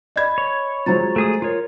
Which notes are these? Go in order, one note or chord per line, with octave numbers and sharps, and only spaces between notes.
D5 D#5 B5 G#6
C#5
F3 F#3 G#3 C5 A#5 A6
A3 G#4 D#6
F4 A#4 C#5